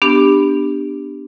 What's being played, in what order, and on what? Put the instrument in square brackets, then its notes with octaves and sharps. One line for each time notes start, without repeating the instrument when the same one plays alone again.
[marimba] B3 D4 G4